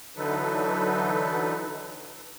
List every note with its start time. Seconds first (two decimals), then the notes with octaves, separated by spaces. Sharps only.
0.16 D3 E3 F#3 D#4 A4 B4